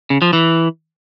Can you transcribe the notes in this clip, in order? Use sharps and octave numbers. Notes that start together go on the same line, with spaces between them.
C#3
F3
E3